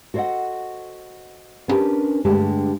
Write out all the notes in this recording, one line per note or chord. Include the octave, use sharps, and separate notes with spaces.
F#4 A4 C5 D5 D#5 F#5
B3 C#4 D4 G4 A#4 B4
G2 D3 G#3 A3 G4 A5